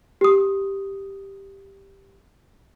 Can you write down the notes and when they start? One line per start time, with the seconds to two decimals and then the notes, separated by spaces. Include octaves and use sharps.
0.21 G4 D#6